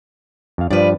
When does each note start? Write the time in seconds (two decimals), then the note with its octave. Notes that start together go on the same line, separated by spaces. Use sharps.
0.58 F2 F5
0.70 G2 F3 B4 D5